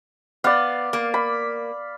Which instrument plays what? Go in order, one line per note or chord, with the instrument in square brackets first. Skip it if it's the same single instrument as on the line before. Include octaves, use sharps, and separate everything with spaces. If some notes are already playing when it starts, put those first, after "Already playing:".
[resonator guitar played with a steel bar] B3 [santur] D5 F5
[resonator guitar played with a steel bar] A#3
[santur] B5